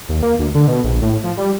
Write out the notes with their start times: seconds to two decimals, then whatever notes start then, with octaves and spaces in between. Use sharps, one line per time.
0.09 D#2
0.23 A#3
0.39 D2
0.55 D3
0.68 B2
0.84 A#1
1.02 A2
1.23 F3
1.37 G3